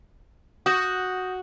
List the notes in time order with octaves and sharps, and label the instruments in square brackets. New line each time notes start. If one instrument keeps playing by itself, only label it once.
[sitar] F#4 [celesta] D#6 G6 A#6